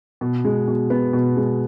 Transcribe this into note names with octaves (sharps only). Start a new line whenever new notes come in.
B2
G#3
B2
B3
B2
G#3